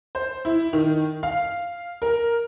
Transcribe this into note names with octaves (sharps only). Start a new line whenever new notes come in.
C5
E4
D#3
F5
A#4